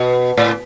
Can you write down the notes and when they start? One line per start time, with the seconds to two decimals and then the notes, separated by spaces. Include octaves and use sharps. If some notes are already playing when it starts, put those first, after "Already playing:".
Already playing: B2
0.37 A2